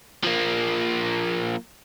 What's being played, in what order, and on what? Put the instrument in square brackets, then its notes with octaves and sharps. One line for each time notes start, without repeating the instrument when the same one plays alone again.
[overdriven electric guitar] F3 A#3